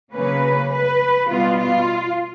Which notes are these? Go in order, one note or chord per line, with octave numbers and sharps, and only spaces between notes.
C#3 F#3 A#3 C#4 B4
B4
B2 G3 B3 F4
F4